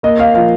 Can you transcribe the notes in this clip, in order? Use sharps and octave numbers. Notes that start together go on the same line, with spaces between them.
A#3 D#5
F5
F3 F5